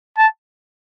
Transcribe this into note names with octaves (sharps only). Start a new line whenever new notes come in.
A5